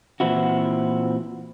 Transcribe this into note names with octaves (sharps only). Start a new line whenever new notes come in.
A#2 E3 C4 E4 F#4